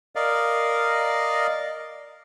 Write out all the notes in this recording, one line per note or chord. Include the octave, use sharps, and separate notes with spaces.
A#4 D5 D#5 F5